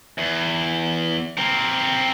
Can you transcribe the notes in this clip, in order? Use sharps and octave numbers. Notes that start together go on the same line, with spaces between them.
E2
C4 A#4